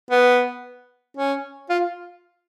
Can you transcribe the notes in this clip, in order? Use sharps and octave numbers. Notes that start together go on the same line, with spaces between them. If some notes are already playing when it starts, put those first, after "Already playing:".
B3
C#4
F4